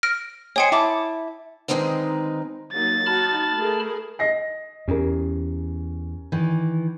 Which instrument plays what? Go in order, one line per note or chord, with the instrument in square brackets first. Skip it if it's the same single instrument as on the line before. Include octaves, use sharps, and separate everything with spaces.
[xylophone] F6 A#6 D7
[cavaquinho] C5 D#5 G#5 [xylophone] C#5 G5 C#7
[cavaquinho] E4 A5 D6
[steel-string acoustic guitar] D3 D#3 G#3 C4 D#4 B4
[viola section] F#3 A#3 D#4 [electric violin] A6
[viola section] D#4 F#4 [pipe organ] A5 B5 F6
[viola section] A3 G#4 A#4
[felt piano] D#5 A#6 C7
[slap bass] E2 [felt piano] C#4 G4 A#4
[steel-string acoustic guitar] D#3 E3